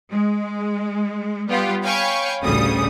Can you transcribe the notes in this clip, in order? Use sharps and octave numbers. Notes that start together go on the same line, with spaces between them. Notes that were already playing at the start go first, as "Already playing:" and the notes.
G#3
G3 B3 F4 G4
C#5 F5 G5 G#5 B5 C#6
A1 D2 C#3 G3 D#6